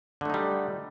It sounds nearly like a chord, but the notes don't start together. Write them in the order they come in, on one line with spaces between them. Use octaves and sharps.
D3 A3 D#4 G3